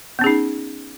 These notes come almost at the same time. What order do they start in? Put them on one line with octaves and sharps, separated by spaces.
B3 C#4 G#4 D#4